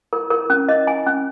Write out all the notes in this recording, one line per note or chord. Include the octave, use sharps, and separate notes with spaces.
A#4
A#4
C#4
D#5
G#5
C#4